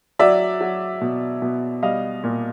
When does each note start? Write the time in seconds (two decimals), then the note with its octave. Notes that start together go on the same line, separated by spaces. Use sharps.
0.19 F#3 D5 E5
0.61 F#3
1.01 B2
1.42 B2
1.83 G3 D#5 F5
2.24 A#2